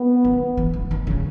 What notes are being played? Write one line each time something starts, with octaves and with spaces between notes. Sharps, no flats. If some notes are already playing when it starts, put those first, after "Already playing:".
Already playing: B3
D#3
E3
E3
D#3
C#3